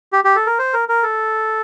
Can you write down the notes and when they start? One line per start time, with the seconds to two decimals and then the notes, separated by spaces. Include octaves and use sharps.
0.13 G4
0.24 G4
0.36 A4
0.47 A#4
0.59 C5
0.74 A#4
0.89 A#4
1.03 A4